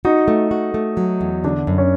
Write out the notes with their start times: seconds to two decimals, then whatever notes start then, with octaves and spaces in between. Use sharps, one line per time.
0.05 D#4 F#4
0.28 A3
0.51 F#4
0.74 A3
0.97 F#3
1.21 E2
1.44 D3 D4
1.67 F#2
1.78 C#4